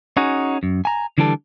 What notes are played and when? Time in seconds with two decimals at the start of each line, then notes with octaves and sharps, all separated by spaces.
0.17 C#4 D#4 F#4 G#4
0.63 F#2
0.85 G#5 A#5
1.18 D3 E3 G3 D4 A4